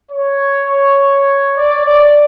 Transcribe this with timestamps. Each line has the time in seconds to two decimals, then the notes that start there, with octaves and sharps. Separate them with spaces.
0.11 C#5
1.57 D5
1.86 D5